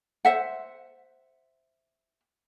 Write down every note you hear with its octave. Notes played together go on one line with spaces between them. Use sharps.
C5 E5 F#5